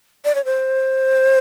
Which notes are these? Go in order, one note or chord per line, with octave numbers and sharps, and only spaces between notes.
D5
C#5
C5